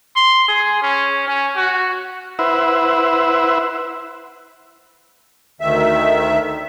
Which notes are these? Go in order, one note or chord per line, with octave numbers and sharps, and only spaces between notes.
C6
G#4
C#4
C#4
F#4
E4 B4 C5 E5 F#5
D2 D#3 E5